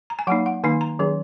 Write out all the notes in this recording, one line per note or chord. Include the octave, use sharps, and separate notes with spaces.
A#5
G#5
F#3 A#3 D#4 F#5
F#5
D#3 A#3 D#4 G#5
A#5
D#3 F#3 C#4 G#4